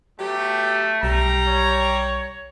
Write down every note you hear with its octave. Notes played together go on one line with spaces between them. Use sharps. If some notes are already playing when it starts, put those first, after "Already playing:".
F#3 A3 B3 G4
B1 G3 A#5
C#5